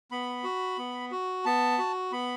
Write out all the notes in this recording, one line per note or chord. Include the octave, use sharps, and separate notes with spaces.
B3 B5
F#4
B3
F#4
B3 A5
F#4
B3 B5